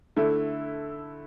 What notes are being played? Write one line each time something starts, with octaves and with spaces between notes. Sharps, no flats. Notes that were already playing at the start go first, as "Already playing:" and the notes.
D3 A3 E4